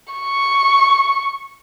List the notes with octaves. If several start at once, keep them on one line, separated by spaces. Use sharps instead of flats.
C#6